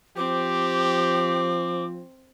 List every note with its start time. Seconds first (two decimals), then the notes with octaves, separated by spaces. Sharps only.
0.17 F3 C4 G4 D6